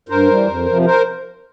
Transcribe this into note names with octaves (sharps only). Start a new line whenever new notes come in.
G2 A#4 C5
E3 G3
F2
C3 F3
A#4 C5